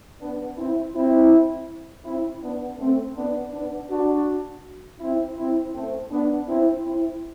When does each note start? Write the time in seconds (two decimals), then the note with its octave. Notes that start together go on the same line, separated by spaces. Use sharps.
0.20 B3 D4
0.57 C4 E4
0.94 C4 E4
2.04 C4 E4
2.41 B3 D4
2.78 A3 C4
3.15 B3 D4
3.52 B3 D4
3.90 D4 F#4
5.00 C4 E4
5.37 C4 E4
5.74 A3 C4
6.11 B3 D4
6.47 C4 E4
6.84 C4 E4